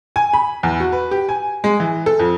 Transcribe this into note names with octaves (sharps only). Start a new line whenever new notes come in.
G#5
B5
E2
F#4
B4
G4
G#5
G#3
E3
A4
F2